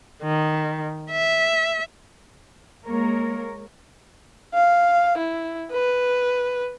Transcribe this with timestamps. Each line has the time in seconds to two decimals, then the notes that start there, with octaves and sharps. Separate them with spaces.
0.23 D#3
1.11 E5
2.85 G#3 A#3 A#4 C#5
4.54 F5
5.18 E4
5.71 B4